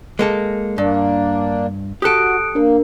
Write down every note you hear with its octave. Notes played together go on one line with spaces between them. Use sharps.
G#3 A#3 A4
G2 A#3 D4
F#4 G4 A4 D#6 F#6 D7
A#3 D4 A#4